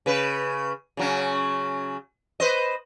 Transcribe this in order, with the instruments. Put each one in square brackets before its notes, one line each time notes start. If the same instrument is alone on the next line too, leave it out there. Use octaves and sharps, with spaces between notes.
[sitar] C#3 B4
C#3 F#3 C#4
B4 C5 D#5